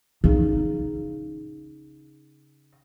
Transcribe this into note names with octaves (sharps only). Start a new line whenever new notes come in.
C#3 D#4